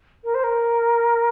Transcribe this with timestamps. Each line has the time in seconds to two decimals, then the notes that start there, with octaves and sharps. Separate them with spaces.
0.24 A#4
0.34 C5
0.43 A#4